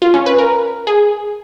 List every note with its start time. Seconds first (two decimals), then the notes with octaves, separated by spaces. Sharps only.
0.02 F4
0.14 C#4
0.26 B4
0.38 A#4
0.87 G#4